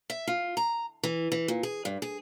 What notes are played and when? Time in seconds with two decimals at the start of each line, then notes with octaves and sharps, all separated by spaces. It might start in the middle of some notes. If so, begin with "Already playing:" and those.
0.10 E5
0.27 F4
0.57 A#5
1.03 E3
1.32 E3
1.48 A#2
1.63 G#4
1.85 G2
2.02 G#4